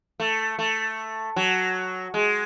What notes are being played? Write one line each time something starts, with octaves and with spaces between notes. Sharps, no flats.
A3
A3
F#3
G#3